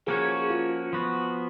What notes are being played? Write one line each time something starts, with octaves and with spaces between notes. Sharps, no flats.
F3 A#3 C#4 F#4 G#4 C#5
F4
F3 B3 F#4